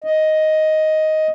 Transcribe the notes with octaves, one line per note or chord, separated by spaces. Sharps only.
D#5